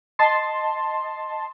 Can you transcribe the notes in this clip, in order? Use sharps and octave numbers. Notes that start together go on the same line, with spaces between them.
D#5 A5 C6